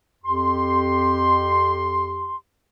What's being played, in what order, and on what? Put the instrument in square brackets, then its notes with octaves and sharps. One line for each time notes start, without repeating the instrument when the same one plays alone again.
[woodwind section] F2 G4 C6